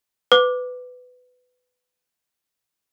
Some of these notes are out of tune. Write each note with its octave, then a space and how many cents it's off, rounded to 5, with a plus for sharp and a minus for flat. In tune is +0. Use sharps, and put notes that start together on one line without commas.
B4 +20 D6 +0